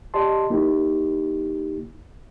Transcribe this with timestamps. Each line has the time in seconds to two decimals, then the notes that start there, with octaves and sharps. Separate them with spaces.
0.14 G4 D5 D#5 A5 C6
0.50 A#3 D#4 E4 G4